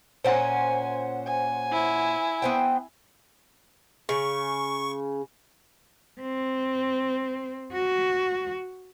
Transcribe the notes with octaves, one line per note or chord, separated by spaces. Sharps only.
A#2 C#4 C5 F#5 G#5 C6
G#5
E4
B3 C5 G5
C#3 C#6
C4
F#4